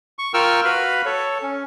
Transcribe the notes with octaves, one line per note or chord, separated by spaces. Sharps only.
C#6
F4 A#4 G5 C#6 E6 F6
F#4 B4 F5 B5
A4 C#5
C#4